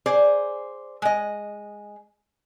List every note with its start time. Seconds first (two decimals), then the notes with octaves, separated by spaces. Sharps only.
0.06 G#4 C5 D5
1.02 G#3 D#5